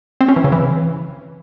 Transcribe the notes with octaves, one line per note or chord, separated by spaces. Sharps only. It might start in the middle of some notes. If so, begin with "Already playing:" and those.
C4
C#4
E3
C#3
E3